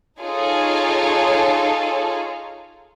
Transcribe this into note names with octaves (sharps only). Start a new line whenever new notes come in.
D#4 F4 G#4 A4 C#5 A#5